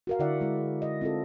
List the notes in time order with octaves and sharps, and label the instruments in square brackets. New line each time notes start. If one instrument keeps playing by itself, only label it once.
[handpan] F#4 A#4 F5
D3 E4 D5 E5 F#5
G#3 E4
D#5
C4 F4 A4